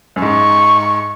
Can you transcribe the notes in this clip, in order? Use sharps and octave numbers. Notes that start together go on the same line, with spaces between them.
F#2
G#2 C#6